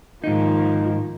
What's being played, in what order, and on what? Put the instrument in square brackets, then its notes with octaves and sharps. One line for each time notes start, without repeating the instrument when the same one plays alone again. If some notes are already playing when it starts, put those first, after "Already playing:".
[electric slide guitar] G#2 D#4 [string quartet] D#3 F3 A#3